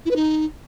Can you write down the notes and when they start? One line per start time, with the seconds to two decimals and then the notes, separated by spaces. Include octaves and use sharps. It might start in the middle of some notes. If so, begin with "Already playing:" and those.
0.05 E4
0.10 B4
0.15 D#4